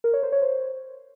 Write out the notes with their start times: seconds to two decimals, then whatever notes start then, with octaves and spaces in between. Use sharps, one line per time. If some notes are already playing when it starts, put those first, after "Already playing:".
0.04 A#4
0.14 C#5
0.23 C5
0.32 C#5
0.42 C5